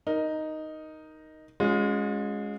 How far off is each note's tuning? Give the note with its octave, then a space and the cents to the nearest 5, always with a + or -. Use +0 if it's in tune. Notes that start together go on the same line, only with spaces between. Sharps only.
D#4 +0 A#4 +0
G#3 -5 C#4 +5 F4 +40